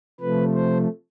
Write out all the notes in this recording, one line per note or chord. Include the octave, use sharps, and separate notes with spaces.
C3 F3 A3 B4
C5